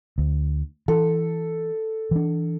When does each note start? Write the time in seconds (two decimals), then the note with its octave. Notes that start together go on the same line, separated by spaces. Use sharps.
0.18 D2
0.88 E3 A4
2.11 E3 D4